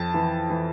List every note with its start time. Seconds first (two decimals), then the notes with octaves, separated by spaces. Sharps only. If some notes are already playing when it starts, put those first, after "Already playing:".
Already playing: F2 A5
0.14 E3
0.50 E3